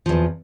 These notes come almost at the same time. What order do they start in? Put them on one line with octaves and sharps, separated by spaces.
F3 E2 B2